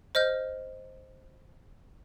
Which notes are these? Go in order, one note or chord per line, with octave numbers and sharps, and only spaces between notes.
C5 D#5 F6 G6